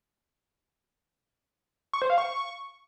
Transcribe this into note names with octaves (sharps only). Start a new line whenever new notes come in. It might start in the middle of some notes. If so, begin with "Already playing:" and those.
C#6
C5
F5
C#6